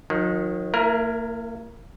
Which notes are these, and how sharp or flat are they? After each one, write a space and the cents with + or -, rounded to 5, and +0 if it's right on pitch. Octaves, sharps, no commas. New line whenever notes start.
D#3 +0 F#3 -45
A#3 -35 E4 +10 A#4 +15